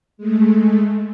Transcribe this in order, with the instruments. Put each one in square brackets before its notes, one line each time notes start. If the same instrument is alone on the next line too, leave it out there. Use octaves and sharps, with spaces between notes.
[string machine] G#3 A3